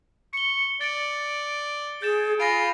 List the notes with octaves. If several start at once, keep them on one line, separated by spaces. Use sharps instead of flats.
C#6 C#7 G7
D5 A6 C#7 D7
G#4 G6 A6 E7
F4 F5 G#5 B5 A#6 D7